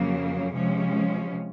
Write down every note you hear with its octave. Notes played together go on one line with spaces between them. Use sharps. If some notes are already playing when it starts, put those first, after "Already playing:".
Already playing: F2 C#3 F#3 A#3
C3 F3 G#3 C#4